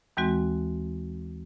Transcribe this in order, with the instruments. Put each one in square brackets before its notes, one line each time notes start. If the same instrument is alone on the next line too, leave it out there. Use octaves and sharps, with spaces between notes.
[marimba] D#2 E3 G#3 C4 F#4